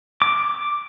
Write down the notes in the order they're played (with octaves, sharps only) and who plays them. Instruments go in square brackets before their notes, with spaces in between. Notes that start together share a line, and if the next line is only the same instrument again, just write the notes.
[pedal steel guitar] D6